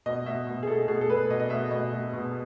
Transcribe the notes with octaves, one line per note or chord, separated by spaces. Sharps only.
B2 D#5
B2 E5
B2
G#4
B2 A4
B2 G#4
A4
B2 B4
B2 D#5
D#5
B2 E5
B2 D#5
B2
B2